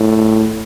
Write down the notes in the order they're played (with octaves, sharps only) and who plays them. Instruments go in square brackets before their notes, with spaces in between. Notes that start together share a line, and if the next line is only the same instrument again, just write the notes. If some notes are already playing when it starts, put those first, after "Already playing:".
Already playing: [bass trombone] A2